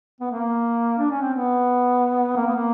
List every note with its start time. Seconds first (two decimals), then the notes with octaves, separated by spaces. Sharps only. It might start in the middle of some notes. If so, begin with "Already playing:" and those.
0.21 B3
0.31 A#3
0.99 D4
1.10 C#4
1.21 C4
1.34 B3
2.36 A#3
2.46 B3
2.56 A#3